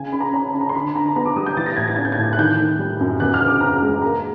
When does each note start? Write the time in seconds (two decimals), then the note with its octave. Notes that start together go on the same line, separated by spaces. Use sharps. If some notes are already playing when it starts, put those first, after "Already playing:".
Already playing: C#3 G#5
0.12 C#3 B5
0.20 A#5
0.34 C#4 A#5
0.47 A5
0.54 C#4
0.61 A#5
0.69 C6
0.75 D3 B5
0.95 D3 A#5
1.06 A5
1.16 B3 A#5
1.25 D6
1.36 G3 D#6
1.46 G6
1.57 E3 A6
1.66 A#6
1.76 A2 G#6
1.88 A6
1.96 C#4 G#6
2.05 G6
2.12 G#6
2.18 A2
2.33 F#6
2.39 D#3 G6
2.58 D#3
2.79 G3
3.01 F#2
3.20 E2 F#6
3.34 F6
3.40 C#3
3.47 D6
3.61 C#3 A#5
3.83 G#3
4.02 A#3 A#5